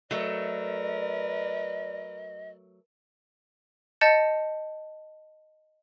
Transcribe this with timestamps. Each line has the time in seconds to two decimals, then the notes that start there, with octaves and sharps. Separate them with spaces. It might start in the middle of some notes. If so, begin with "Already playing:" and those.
0.11 F#3 A3 A#4 B4 D5 D#5
4.01 D#5 A5 G6 A6 C#7